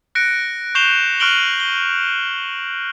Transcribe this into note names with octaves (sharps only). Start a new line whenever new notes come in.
F#6 A#6 C#7 D7
C#6 G6 C7 E7 F7 G7
C#6 F6 F#6 D7 F#7 G7
G7